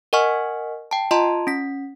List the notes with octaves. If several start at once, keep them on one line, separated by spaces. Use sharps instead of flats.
A#4 D#5 F#5 G#5 C#6 F6
G5 A5
F4 D#5 A5 A#5 C6
C#4 B6